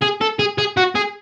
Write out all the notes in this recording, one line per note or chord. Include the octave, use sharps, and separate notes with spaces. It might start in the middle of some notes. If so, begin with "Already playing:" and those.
G#4
A4
G#4
G#4
F#4
G#4